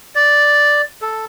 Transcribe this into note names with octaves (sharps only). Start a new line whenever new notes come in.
D5
A4